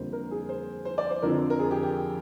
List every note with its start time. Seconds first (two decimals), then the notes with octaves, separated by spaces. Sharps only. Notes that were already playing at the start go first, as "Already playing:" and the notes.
Already playing: F2 D3 G3 A#3 C5
0.13 A#4
0.31 G#4
0.49 C5
0.85 C5
0.98 D5
1.10 C5
1.22 F2 D3 F3 A#4
1.50 A#4
1.59 G#4
1.71 G4
1.83 G4